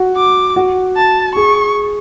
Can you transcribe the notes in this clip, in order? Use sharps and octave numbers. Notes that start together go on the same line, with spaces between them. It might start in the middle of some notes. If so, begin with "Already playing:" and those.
Already playing: F#4
D6
F#4
A5
G#4 C#6